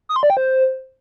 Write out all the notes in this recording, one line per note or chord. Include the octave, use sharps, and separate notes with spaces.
D#6
C6
D5
G5
C5